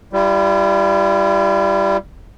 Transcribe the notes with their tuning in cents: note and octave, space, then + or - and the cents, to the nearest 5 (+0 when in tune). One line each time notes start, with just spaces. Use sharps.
G3 +0 E4 +45